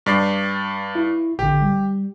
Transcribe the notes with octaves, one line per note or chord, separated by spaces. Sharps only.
G2 D5 C7
E4
A1 D3 G4
G3